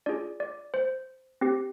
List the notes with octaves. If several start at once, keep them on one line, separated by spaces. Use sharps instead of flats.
D4 F4 G#4 D5
D5
C5
C4 G4